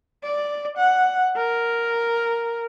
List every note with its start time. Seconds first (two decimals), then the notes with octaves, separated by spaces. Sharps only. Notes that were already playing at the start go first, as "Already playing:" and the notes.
0.23 D5
0.77 F#5
1.36 A#4